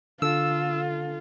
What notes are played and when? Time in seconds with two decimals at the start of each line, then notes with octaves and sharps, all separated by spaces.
0.22 D3 F4 A4 E6